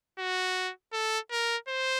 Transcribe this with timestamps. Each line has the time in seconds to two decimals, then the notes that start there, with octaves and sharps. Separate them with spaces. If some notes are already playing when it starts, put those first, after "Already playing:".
0.19 F#4
0.93 A4
1.31 A#4
1.68 C5